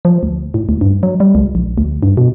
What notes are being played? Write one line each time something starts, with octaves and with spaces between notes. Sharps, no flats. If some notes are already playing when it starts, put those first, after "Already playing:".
F3
D2
A2
D2
G2
F#3
G3
C#2
A#1
D2
G2
B2